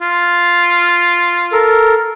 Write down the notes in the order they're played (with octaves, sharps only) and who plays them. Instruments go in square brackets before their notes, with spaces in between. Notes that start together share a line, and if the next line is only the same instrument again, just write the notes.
[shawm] F4
[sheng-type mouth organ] A4 A#4